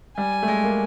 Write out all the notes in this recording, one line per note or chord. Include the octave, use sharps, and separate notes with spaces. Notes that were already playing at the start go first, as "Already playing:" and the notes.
G3 G#5
A3
G#3
A#3